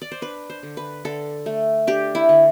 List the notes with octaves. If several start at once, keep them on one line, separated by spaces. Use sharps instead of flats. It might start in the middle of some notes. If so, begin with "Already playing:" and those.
D5
C5
D4 B4
C5
D3
B4
D3 A4
A3
D4 G4
E4
D3